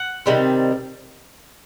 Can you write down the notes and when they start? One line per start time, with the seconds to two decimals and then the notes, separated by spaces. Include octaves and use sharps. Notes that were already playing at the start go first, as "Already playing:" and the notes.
Already playing: F#5
0.26 C3 D#3 G3 C4